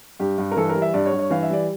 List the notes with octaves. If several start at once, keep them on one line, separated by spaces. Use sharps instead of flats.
G2 G4
G2
A#4
E3 A4
A#4
G3
E5
G2 D5
C#5
G2
C#5
E3 F5
E5
G3 D5